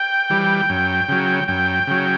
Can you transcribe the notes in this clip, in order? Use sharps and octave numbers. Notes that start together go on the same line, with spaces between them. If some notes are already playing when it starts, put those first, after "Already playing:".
Already playing: G5
E3 G3
F#2
C#3 F#3
F#2 G5
C#3 F#3